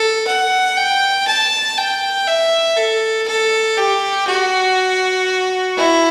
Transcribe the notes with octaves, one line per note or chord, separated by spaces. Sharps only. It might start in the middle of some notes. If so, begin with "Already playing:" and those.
Already playing: A4
F#5
G5
A5
G5
E5
A4
A4
G4
F#4
E4